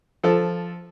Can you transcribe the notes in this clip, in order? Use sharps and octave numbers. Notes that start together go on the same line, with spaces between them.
F3 A4